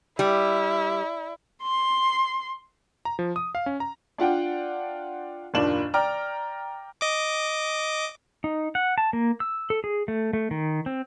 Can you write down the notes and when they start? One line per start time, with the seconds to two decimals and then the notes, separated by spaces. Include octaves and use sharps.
0.19 G3 E4
1.62 C6
3.05 A#5
3.19 F3
3.36 D#6
3.55 F5
3.66 C#4
3.80 A#5
4.18 D4 F4 F#5 G5
5.54 F#1 D#2 A#2 D4 E7 F#7
5.94 D5 G5 A#5 F6
7.01 D#5 D6
8.44 D#4
8.75 F#5
8.98 A5
9.13 A#3
9.40 E6
9.70 A4
9.84 G#4
10.08 A3
10.33 A3
10.51 D#3
10.86 C4